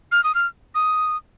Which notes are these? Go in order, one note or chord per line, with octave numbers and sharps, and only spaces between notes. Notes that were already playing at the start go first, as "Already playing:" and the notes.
F6
D#6
F6
D#6